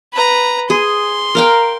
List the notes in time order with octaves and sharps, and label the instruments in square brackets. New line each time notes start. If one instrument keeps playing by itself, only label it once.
[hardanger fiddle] B4 A#5
[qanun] G#4 [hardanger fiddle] C6
[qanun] A#4 F5 G5